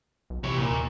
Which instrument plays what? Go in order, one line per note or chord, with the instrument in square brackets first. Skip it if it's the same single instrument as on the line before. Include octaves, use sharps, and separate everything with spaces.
[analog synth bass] B1
[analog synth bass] C3 [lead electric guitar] E3 C#5
[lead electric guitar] A#2
[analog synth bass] D#2